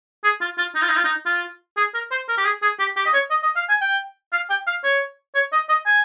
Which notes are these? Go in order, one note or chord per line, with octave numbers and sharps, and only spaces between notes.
G#4
F4
F4
D#4
F4
D#4
F4
D#4
F4
G#4
A#4
C5
A#4
G4
G#4
G#4
G4
G4
D#5
C#5
D#5
D#5
F5
G#5
G5
F5
G5
F5
C#5
C#5
D#5
D#5
G#5